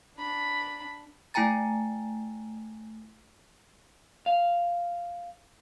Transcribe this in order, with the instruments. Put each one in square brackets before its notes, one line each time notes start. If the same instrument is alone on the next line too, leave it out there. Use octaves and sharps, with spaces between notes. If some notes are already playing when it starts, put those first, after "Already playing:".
[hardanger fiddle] D4 B5
[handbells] A3 E4 G5 G#5 A#5 A6
[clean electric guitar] F5